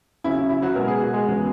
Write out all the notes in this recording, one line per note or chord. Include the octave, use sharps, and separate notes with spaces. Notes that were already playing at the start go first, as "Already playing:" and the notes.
C#3 F#3 C#4 E4
E4
E4
F#3 F#4
B2 G#3 B3 A#4
G#4
F#4
G#3 G#4
E2 C#3 F#3 B3